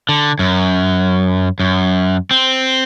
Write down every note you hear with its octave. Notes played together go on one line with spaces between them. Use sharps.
D3
F#2
F#2
C4